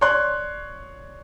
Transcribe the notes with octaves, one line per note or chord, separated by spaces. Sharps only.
C#5 D5 C6 F#6